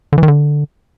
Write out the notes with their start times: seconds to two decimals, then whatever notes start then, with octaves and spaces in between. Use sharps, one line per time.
0.13 D3
0.18 E3
0.23 D#3
0.28 D3